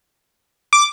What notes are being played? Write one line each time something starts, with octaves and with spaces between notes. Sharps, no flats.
D6